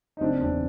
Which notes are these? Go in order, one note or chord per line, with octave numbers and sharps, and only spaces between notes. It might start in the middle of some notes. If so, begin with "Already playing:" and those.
D#4
F#1 C4 D4
E2 C#3 C4 D4